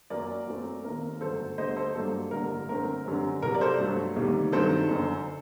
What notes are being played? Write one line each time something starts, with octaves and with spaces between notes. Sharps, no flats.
F#2 F#3 A#3 A#4 D5
F#2 F#3 A3 C4
D#2 D#3 A3 C4 A#4
G1 F#2 F#3 A3 A4 C5
D2 D3 G3 C5 D#5
A4 C5
G2 F#3 A#3 A4
A1 G2 D3 G3 A#3 A#4
F#2 D3 A3 C4 A#4
F#2 D3 G3 C4
C2 C3 F#3 A#4
D5
A4 C5
G2 F#3 A3
D2 C3 D#3 G3 A#3
G2 D#3 F#3 C4 A4 C5
F#1 F#2 D3